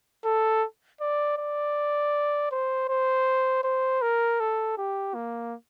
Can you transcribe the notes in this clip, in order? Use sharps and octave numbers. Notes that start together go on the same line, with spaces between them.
A4
D5
D5
C5
C5
C5
A#4
A4
G4
A#3